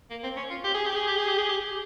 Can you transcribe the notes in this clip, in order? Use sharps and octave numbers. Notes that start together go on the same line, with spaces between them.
A#3
C4
C#4
F4
G4
G#4
G4
G#4
G4
G#4
G4
G#4
G4